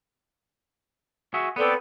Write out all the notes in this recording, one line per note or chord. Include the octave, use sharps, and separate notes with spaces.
F#4 G#4 E5
B3 C4 A4 B4 D5